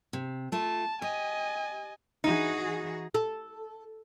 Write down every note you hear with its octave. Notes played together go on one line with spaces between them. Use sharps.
C3
A3 F4 A5
G4 D#5 G#5
E3 D#4 F#4 G#4
A4